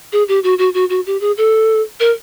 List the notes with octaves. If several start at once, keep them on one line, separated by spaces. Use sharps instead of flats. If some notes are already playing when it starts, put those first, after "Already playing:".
G#4
G4
F#4
F#4
F#4
F#4
G4
G#4
A4
A#4